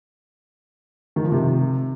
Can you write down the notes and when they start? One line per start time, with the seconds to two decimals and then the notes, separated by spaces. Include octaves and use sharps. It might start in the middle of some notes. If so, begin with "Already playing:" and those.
1.16 D#3
1.24 F3
1.32 C3